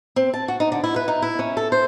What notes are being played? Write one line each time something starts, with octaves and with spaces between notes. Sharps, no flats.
C4
A5
F#4
D#4
D3
E4
B4
D#4
E4
C#4
A4
C5